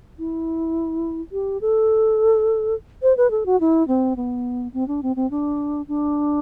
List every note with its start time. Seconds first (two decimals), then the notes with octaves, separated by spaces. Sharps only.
0.19 E4
1.32 G4
1.61 A4
3.02 C5
3.17 B4
3.31 A4
3.46 F#4
3.60 E4
3.88 C4
4.16 B3
4.73 C4
4.88 D4
5.03 C4
5.16 C4
5.31 D4
5.88 D4